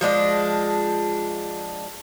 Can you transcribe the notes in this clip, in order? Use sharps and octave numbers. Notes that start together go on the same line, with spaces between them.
F3 G#3 D4 D#5